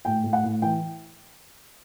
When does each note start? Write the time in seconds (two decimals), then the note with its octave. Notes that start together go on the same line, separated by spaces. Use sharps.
0.05 A2 G5
0.23 A2
0.33 F#5
0.43 A2
0.62 E3 G5